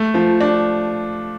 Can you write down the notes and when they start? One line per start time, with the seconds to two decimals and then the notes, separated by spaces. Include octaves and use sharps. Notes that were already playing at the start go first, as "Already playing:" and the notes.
Already playing: A3
0.14 F3
0.41 D4